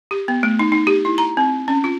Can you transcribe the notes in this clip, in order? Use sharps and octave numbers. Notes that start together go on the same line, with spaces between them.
G4
B3
A3
D#4
D#4
G4
E4
A#5
C4
C#4
F4